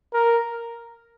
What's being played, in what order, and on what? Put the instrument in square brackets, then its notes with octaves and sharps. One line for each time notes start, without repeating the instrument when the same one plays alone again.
[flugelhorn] A#4